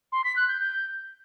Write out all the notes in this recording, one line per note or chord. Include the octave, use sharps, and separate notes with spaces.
C6
B6
F#6
G6
G6